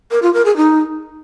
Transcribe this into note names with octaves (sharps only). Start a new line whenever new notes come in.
A#4
F4
A#4
G#4
D#4